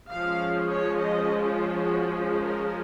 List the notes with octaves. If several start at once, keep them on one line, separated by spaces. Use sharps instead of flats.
F3 G#3 C#4 F5
C#5
D#5
F4
F#4
G#4
A#4